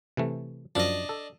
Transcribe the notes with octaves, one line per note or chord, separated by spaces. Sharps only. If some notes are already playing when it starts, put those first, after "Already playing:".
C3 E3 A3
F#2 F3 D4 D#5
A4